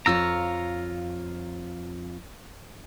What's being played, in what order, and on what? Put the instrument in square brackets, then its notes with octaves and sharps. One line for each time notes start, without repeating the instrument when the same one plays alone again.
[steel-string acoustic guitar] F2 F4 C#5 [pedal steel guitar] A#5 E6